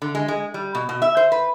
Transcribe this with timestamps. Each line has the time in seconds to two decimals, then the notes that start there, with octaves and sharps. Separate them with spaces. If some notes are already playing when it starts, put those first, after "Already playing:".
0.02 D3
0.15 G#3
0.28 G#3
0.54 G3
0.75 B2
0.89 B2
1.02 E5
1.17 C5
1.32 B4